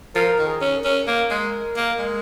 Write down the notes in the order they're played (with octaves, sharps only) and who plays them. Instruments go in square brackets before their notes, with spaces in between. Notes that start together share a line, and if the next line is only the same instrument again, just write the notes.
[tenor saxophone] F3 [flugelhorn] A#4
[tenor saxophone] D#3
[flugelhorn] G#4
[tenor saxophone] C#4
[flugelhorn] A#4
[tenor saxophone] C#4
[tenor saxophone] A#3 [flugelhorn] A#4
[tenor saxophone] G#3
A#3
G#3